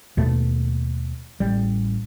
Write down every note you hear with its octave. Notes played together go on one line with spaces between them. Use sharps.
D#2 B2 A3
A1 G3